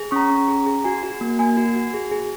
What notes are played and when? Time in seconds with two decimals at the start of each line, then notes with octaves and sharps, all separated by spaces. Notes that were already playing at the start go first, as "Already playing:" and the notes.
Already playing: G#4
0.11 C#4 A#5 C#6
0.30 C#4
0.48 G#4
0.67 G#4
0.84 F#4 G#5
1.03 F#4
1.21 A#3
1.39 A#3 G#5
1.57 F#4
1.76 F#4
1.94 G#4
2.12 G#4